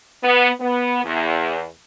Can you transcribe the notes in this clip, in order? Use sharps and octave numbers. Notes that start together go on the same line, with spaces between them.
B3
B3
E2